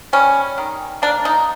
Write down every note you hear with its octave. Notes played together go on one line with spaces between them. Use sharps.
G3 C#4
D#3
A#3 D4
D#4